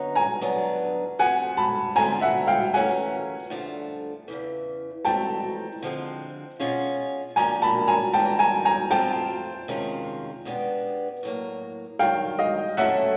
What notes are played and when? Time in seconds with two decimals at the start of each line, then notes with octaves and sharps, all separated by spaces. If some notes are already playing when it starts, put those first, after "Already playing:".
Already playing: F#2 D3 F#3 B3 D#4
0.15 G#5 A#5
0.41 F#3 B3 D4
1.19 F3 A3 C4 F#5 G#5
1.57 A5 B5
1.96 D3 F3 A3 C4 E4 G#5 A#5
2.21 E5 F#5
2.47 F5 G5
2.74 E3 A3 C#4 F#4 A#4 F#5 G#5
3.50 G2 D3 F3 A3
4.28 E2 C#3 E3
5.05 E3 A3 C4 D#4 G5 A5
5.83 D3 F3 G#3 C4
6.60 B2 G#3 C#4 F4
7.36 F3 A#3 D4 G4 A#4 G#5 A#5
7.62 A5 B5
7.88 G#5 A#5
8.13 G#2 E3 G3 A#3 D#4 G5 A5
8.39 G#5 A#5
8.65 G#5 A#5
8.91 F3 A3 C4 F4 G5 A5
9.68 C3 D#3 G#3 C#4 F4
10.45 B2 G#3 B3 D4 G4
11.23 A2 F#3 A#3
11.99 G2 D#3 F#3 F5 G5
12.39 D#5 F5
12.77 F#3 A3 C#4 E4 A4 E5 F#5